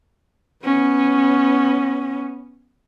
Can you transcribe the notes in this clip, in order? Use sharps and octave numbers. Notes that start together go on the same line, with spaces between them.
B3 C#4